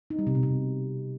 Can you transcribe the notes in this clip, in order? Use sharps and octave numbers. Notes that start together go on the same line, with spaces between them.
D#4
G3
C3
B2
C3